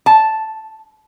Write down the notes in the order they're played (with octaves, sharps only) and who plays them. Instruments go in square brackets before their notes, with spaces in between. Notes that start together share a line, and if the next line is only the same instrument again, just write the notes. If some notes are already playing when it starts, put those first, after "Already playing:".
[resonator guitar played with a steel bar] A5